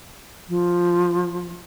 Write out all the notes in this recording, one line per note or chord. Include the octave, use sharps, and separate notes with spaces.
F3